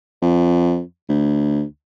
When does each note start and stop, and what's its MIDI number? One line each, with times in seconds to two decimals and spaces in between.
0.22 0.81 41
1.09 1.62 38